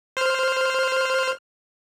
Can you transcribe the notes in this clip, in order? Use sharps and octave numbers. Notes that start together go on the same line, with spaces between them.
C5 F6